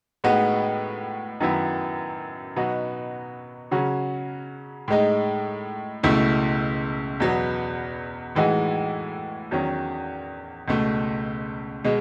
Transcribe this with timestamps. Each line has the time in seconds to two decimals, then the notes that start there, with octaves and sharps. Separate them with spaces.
0.24 A2 G#3 B3 D#4 F#4
1.40 F#2 D#3 F#3 B3 E4
2.56 B2 F#3 B3 D#4 F#4
3.71 C#3 F#3 C#4 F#4
4.88 A2 G#3 D#4
6.03 C#2 B2 A3 E4
7.20 E2 B2 F#3 B3
8.35 A2 E3 G#3 D#4 F#4
9.51 E2 D#3 F#3 C#4
10.68 C#2 B2 A3
11.84 B2 G#3